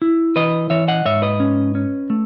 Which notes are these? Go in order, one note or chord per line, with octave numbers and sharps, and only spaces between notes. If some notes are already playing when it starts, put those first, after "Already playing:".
E4
E3 B4 D#5
E3 C#5 E5
D#5 F#5
G#2 C#5 E5
B4 D#5
C#4
C#4
A3